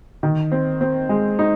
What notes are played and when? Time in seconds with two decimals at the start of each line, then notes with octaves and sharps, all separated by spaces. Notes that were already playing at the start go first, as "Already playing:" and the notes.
0.23 D#3
0.52 C4
0.81 C4
1.09 G#3
1.39 D#4